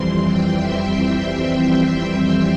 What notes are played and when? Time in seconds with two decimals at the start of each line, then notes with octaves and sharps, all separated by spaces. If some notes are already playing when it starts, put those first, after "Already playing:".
Already playing: F2 E3 G3 C4 C6
0.25 G5
0.62 E5
2.06 G5